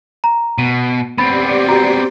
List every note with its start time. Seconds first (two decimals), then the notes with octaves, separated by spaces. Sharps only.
0.24 A#5
0.58 B2 D#7
1.18 B3 C4 G4 D5 B5 A6
1.68 F#4 A#5